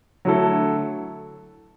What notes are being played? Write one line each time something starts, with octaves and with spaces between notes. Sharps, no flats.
D3 F#3 A3 E4 A4